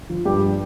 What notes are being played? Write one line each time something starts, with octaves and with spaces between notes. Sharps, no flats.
F3
G2 G4